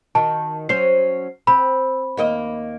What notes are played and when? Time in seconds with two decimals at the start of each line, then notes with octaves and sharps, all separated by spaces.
0.15 D#3 F#4 A5
0.69 F#3 C#4 C5 C7
1.47 C4 B5
2.17 D#2 A#3 D#5